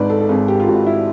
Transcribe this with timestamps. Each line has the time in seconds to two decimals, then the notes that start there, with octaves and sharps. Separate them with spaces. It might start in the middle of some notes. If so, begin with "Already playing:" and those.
Already playing: G#1 G#2 B4 D5
0.10 A4
0.21 A4
0.29 G#1 G#4
0.48 G4
0.60 F4
0.68 G#1 F#4
0.87 E4